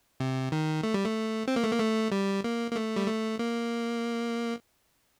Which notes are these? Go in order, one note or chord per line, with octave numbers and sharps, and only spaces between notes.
C3
D#3
A3
G3
A3
C4
A#3
A3
A#3
A3
G3
A#3
A#3
A3
G3
A3
A#3